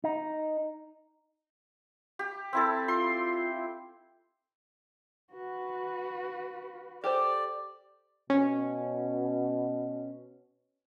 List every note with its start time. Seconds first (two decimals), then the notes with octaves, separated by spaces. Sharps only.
0.04 D#4
2.19 G4
2.53 C4 E4 A4
2.88 F4 C6
5.32 F#4 B4
7.04 G4 A4 C5 D5
8.30 B2 C#4